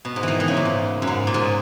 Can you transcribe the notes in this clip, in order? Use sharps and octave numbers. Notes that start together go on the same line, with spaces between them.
B2
G#2
D#3 E3
E3
C#3
A#2
G#2
F#2
G#2
A#2
G#2